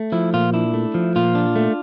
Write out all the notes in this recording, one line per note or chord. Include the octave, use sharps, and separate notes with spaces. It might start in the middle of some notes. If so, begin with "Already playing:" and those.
Already playing: A3
F3 E4
A#2 F4
D4 E4
A3
F3
A#2 F4
D4
A3